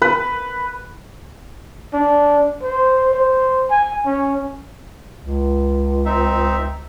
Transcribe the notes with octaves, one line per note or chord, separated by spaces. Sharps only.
B4
D4
C5
C5
G#5
C#4
C#2
C4 D#4 E5